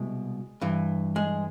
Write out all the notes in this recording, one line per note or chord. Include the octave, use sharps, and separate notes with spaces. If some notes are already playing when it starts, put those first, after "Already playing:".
Already playing: C2 B2 G#3
G2 E3
G#3